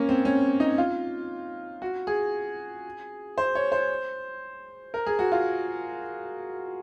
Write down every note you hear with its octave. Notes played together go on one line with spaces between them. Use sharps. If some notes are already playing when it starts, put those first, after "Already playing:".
Already playing: A#3 C#4
C4
C#4
D#4
F4
F#4
G#4
C5
C#5
C5
A#4
G#4
F#4
F4